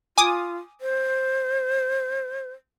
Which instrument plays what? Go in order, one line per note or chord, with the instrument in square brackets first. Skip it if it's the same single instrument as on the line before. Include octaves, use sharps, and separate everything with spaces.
[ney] F4 [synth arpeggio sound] G#5 D6 D#6
[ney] C5